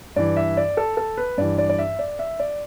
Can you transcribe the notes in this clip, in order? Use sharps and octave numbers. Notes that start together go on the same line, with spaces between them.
G2 E3 D5
E5
D5
A4
A4
B4
G2 E3 D5
D5
D5
E5
D5
E5
D5